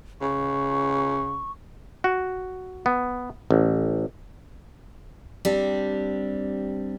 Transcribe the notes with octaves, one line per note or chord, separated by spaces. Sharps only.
C#3 C#6
F#4
B3
A1
G3 C4 D4 G4